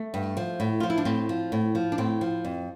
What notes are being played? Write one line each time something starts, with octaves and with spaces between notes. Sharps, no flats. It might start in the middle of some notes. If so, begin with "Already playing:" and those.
Already playing: A3
G2
F3
A2
F3 F4
E4
D4
A2 C4
F3
A2
F3
D4
A2 C4
F3
F2